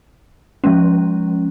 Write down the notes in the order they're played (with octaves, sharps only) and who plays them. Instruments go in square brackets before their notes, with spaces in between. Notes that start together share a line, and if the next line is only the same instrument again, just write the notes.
[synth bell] F3 G#3 C#4